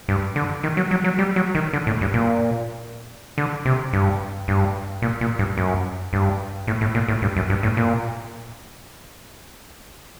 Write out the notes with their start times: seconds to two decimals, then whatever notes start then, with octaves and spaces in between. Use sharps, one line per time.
0.09 G2
0.36 D3
0.63 D#3
0.77 F#3
0.91 F#3
1.04 F#3
1.19 G3
1.36 F#3
1.55 D#3
1.73 D3
1.87 A2
2.01 G2
2.14 A#2
3.38 D3
3.65 C3
3.93 G2
4.48 G2
5.02 A#2
5.21 A#2
5.39 G2
5.57 F#2
6.13 G2
6.67 A2
6.81 A2
6.95 A#2
7.08 A2
7.22 G2
7.37 F#2
7.50 G2
7.63 A2
7.77 A#2